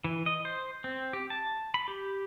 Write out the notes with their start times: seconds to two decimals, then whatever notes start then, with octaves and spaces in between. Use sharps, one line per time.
0.04 E3
0.26 D#5
0.45 C5
0.84 C4
1.13 G4
1.30 A5
1.74 B5
1.88 G4